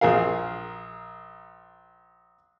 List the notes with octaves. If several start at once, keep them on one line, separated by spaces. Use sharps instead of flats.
A#1 G#4 A#4 F5